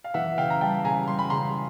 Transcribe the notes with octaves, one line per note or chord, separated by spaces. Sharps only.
F5
E3 E5 F#5
C#3 F5 G5
A#5
G3 G5 A5
C#3 G#5 A#5
G3 C6
B5
C#3 A#5 C6